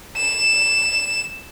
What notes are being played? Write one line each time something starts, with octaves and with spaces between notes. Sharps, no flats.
E7